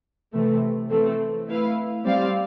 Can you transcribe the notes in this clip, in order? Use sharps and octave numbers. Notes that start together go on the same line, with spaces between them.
C3 E3 A3
E3 A3 C4
A3 E4 B4 F5
G3 C4 G4 D5 F5